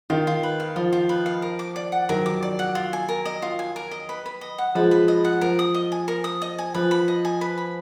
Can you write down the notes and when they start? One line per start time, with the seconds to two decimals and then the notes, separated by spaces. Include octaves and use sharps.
0.10 D#3 F4
0.27 F4
0.43 B4
0.60 F5
0.76 F3 F4
0.93 F4
1.09 B4
1.26 F5
1.42 A#4
1.59 D6
1.76 D5
1.92 F#5
2.09 D#3 F#3 A#4
2.26 D6
2.43 D5
2.59 F#5
2.75 F4
2.93 G#5
3.09 A#4
3.25 D#5
3.42 F4
3.59 G#5
3.76 A#4
3.91 D#5
4.09 B4
4.26 B4
4.41 D#5
4.58 F#5
4.75 F3 G#3 B4
4.91 B4
5.08 D#5
5.25 F#5
5.41 F3 A#4
5.59 D#6
5.74 D#5
5.92 G#5
6.08 A#4
6.24 D#6
6.42 D#5
6.58 G#5
6.74 F3 B4
6.91 B5
7.08 D#5
7.25 G#5
7.41 B4
7.58 B5